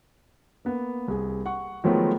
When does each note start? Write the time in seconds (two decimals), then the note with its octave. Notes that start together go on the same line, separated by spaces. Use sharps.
0.65 A#3 B3
1.08 C2 G#4
1.46 F#5 C#6
1.84 D#3 F3 F#3 G#3 A3 B3